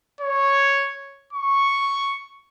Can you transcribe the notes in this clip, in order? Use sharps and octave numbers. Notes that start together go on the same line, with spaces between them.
C#5
C#6